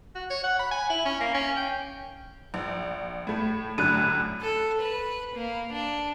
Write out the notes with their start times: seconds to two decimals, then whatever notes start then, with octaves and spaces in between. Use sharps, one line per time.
0.15 F#4
0.30 C#5
0.44 F#5
0.60 B5
0.71 G#5
0.90 E4
1.05 C#4
1.21 A#3
1.34 C#4
1.57 G5
2.54 A#1
3.27 A2 A3
3.78 F#2 A2 D3 F#6 D#7
4.41 A4
4.81 B4
5.35 A#3
5.72 D4